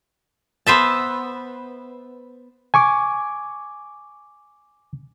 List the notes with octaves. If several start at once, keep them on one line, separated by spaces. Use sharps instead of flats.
B3 C5 E5 A5
G#5 C#6 D6